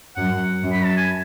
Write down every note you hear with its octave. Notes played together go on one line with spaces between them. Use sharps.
F#2 F#5
F#2
B5
A5
G#5